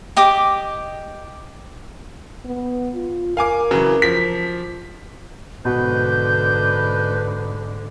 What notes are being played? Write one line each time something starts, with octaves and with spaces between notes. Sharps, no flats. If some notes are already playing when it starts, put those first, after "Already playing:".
G4 D#5 D6
B3
F4
A#4 F5 G#5 D6
C#3 E3 F#3
F3 B6
G#2 B2 D3 F#4 B4 G6